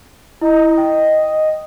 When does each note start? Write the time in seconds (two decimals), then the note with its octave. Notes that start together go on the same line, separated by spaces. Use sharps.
0.41 E4 D#5 A#5
0.78 G5